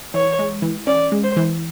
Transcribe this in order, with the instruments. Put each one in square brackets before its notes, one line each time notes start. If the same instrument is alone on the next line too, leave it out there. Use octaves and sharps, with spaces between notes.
[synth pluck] E3 [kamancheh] C#5
[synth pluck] G#3
E3
[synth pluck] C#4 [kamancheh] D5
[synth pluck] G#3
[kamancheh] C5
[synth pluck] E3